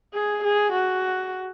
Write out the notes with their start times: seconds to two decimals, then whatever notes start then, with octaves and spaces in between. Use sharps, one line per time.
0.14 G#4
0.44 G#4
0.72 F#4